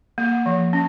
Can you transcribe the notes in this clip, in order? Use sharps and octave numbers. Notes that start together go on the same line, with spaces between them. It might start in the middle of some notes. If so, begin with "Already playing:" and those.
A#3
F3
C#4